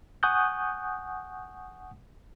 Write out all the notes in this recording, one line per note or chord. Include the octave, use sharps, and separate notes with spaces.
F#5 G#5 C#6 D#6 F#6 G6